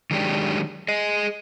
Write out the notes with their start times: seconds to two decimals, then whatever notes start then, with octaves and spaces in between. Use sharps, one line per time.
0.11 D#3 F#3 G#3 D4 G4
0.88 G#4 D#5